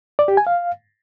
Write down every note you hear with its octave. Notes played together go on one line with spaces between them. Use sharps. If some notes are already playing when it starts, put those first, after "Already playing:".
D5
G4
G#5
F5